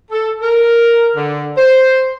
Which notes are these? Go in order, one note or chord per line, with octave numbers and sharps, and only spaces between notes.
A4
A#4
D3
C5